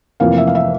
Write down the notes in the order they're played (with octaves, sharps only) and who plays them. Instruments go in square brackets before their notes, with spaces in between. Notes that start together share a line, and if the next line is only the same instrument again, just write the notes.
[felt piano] F1 F2 E3 A#3 F5
E5
F5
E5